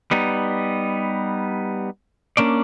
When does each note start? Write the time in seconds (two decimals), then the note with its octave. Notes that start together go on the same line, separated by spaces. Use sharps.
0.11 G3 B3 D#4
2.37 A#3 C#4 D4 D5